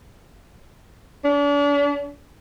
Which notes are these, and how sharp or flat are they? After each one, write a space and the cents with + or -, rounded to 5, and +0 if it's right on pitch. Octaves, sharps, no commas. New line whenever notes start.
D4 -40